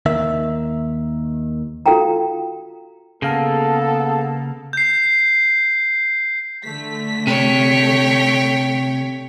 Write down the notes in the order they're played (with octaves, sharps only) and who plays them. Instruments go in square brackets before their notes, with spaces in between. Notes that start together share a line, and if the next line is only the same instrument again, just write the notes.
[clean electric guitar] D#2 D#3 E5
[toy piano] F4 F#4 A4 F5 G5 A#5
[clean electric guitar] C#3 A#3 [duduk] B3 [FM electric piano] G#4 F5 A5 [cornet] A4
[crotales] G6 C7
[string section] D3 A3 B6
[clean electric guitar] C3 [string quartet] C#5 G5